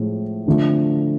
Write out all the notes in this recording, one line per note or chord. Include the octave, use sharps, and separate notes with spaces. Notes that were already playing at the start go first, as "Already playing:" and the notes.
Already playing: A2 F3 G#3
D3 F3 A3